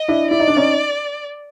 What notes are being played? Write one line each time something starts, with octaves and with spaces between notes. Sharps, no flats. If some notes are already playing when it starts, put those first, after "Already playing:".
Already playing: D#5
D4 E4
E4 D5
D#4
D4
C#4 D#4